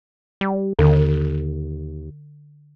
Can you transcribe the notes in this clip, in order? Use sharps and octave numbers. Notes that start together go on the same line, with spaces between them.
G3
D#2 D3